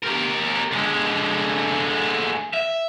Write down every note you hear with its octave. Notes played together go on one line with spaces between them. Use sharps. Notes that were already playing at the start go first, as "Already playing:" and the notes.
G4 A#4
D3 G#3
E5